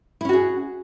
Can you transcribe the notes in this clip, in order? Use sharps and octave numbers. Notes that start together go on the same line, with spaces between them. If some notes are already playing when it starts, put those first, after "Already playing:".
C#4 E4 F#4 G#4